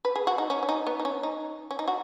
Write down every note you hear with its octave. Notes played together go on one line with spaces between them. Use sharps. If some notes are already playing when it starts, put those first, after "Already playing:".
B4
G#4
F#4
D#4
C#4
C#4
D#4
B3
D#4
C#4
D#4
C#4
D#4
F#4